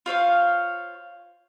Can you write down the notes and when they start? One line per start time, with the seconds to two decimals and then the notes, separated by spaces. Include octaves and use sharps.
0.06 F4 C5 C#5 F5